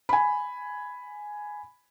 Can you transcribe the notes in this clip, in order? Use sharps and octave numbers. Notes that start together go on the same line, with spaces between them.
G#5 B5